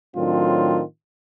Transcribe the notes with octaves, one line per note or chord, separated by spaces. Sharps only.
A2 D#3 F#3 C4 D4 F4